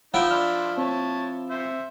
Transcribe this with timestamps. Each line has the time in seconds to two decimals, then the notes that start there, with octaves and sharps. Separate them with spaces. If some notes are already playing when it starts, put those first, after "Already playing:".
0.14 F3 D#4 E4 F#5 G5
0.31 D4 B5 C6 F6
0.78 C4 C#5 A5
1.51 C5 E5